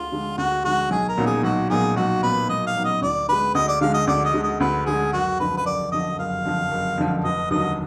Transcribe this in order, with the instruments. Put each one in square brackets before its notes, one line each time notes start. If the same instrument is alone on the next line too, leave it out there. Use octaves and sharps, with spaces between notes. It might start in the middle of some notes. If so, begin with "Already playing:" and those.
Already playing: [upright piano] D2 D3 G#3 [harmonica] F4
[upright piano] D3 G#3
[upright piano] D2 [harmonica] F#4
[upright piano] D3 G#3 [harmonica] F#4
[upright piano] B1 [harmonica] G#4
[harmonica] A#4
[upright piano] A#2 F#3 B3 D#4
[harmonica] G#4
[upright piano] B1 [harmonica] F#4
[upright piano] A#2 F#3 B3 D#4 [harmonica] G#4
[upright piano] B1 [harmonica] F#4
[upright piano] A#2 F#3 B3 D#4 [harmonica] B4
[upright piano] B1 [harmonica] D#5
[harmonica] F5
[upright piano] A#2 F#3 B3 D#4
[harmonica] D#5
[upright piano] D2 [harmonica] D5
[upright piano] D3 G#3 [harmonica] B4
[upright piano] D2 [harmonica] D#5
[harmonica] D5
[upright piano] D3 G#3 [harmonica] F5
[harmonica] D#5
[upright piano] D2 [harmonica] D5
[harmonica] D#5
[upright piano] D3 G#3
[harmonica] D#5
[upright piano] D2 [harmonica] B4
[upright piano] D3 G#3 [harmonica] G#4
[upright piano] F#1 [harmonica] F#4
[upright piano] F2 D3 F3 [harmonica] B4
[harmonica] B4
[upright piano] F#1 [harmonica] D5
[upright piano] F2 D3 F3 [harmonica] D#5
[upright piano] F#1 [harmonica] F5
[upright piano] F2 D3 F3
F#1
F2 D3 F3
[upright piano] F1 [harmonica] D#5
[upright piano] D#2 D3 F#3 [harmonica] D#5